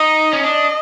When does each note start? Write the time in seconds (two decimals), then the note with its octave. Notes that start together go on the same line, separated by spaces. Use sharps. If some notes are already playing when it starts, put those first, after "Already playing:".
Already playing: D#4 D#5
0.33 C#4
0.43 D4 D#5